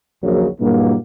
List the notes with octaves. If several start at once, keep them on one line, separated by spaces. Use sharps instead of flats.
A#1 D#2 C#3 F#3
G2 A#2 E3 F#3 G#3 A#3